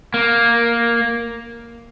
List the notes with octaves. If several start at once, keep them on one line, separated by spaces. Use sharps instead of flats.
A#3